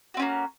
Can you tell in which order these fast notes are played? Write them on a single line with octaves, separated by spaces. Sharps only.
F#4 C4 C#4 A#3